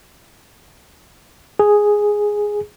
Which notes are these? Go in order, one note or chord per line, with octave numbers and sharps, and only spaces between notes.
G#4